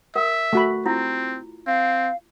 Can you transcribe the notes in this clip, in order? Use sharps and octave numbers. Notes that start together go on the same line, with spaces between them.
A#4 E5
A3 F#4 B5
C4 E4 F4
C4 F5